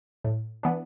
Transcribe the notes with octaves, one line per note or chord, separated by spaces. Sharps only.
A2
E3 B3 D4